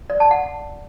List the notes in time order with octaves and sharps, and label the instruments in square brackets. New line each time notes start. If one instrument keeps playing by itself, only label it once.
[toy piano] D5
A5
F#5